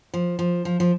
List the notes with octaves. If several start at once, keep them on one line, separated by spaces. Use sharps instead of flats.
F3
F3
F3
F3